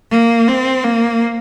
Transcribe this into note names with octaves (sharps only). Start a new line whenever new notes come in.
A#3
C4
A#3